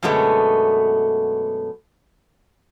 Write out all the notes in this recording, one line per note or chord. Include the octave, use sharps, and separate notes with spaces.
F#2 B2 D3 G#3 A3 B3